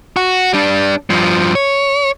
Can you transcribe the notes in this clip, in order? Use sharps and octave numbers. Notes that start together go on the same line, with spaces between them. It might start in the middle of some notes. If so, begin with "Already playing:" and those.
F#4
G3 D4
G2 F3
C#5